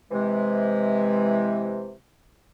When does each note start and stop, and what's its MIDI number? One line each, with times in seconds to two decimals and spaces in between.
0.11 1.93 48
0.11 1.93 52
0.11 1.93 56